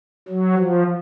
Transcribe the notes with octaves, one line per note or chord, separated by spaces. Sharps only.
F#3
F3